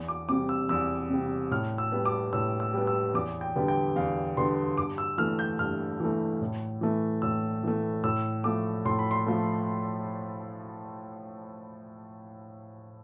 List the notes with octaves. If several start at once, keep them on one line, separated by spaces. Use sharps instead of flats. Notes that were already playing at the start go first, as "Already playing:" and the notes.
Already playing: E2
D6
C3 G3 D6
E6
E2 E6
C3 G3
A2 F6
E6
G3 B3
D6
A2 E6
E6
G3 B3
E6
E2 D6
G5
D3 G3 B3
G5
E2 F5
D3 G3 B3 C6
G2 D6
E6
E3 A3 F6
G6
G2 F6
E3 A3
A2
E3 A3
A2 E6
E3 A3
A2 E6
F3 A3 D6
A2 C6
B5
C6
F3 A3